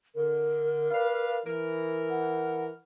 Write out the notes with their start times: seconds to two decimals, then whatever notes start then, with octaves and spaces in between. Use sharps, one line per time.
0.15 D3 A#4
0.90 B4 D5 F5
1.45 E3 A#4
2.10 F#5